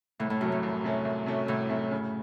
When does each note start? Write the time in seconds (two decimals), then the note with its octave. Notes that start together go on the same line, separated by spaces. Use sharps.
0.20 C2 A2
0.30 A2
0.41 F#2 C3 F#3 A3 C#4
0.52 A2
0.63 C2
0.84 C3 F#3 A3 C#4
1.05 C2
1.26 C3 F#3 A3 C#4
1.48 C2 A2
1.69 C3 F#3 A3 C#4
1.91 C#3